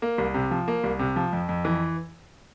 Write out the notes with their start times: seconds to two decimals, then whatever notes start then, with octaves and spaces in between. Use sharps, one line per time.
0.02 A#3
0.18 C2
0.34 C3
0.51 F3
0.68 A#3
0.84 C2
0.99 C3
1.16 F3
1.33 F2
1.49 F2
1.65 E3